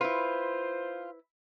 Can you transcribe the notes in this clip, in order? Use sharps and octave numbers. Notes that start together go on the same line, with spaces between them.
E4 F4 B4 C5